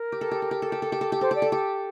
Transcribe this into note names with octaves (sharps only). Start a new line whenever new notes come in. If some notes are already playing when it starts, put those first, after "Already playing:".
Already playing: A#4
G4
A4
G4
A4
G4
A4
G4
A4
G4
A4
G4
A4 C5
G4 D5
A4
G4